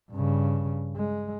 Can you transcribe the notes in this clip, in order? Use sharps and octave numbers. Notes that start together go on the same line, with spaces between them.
G2 C#3
G#3